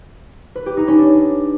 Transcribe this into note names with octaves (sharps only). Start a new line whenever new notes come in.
B4
G4
D#4
C#4
D4